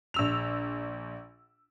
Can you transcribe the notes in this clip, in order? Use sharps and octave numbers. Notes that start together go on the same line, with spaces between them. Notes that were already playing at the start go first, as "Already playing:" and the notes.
A#1 E6 F7